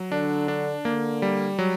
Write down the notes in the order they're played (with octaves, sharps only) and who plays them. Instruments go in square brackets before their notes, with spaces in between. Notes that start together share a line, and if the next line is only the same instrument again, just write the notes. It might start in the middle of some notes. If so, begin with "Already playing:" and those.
Already playing: [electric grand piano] F#3
[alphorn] D3 [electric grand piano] D4
[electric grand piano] D4
[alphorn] D3 [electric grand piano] A#3
[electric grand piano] G3
F#3